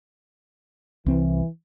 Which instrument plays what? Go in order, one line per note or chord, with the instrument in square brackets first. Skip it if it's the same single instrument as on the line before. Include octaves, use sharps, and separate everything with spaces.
[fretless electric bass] C2 C4 [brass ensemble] E3